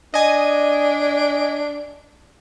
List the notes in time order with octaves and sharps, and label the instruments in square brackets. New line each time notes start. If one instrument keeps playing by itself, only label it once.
[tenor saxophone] D4 [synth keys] D#5 G#5